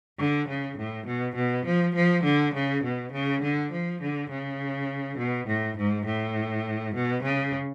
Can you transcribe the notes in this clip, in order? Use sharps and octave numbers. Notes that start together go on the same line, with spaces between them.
D3
C#3
A2
B2
B2
F3
F3
D3
C#3
B2
C#3
D3
F3
D3
C#3
B2
A2
G#2
A2
B2
C#3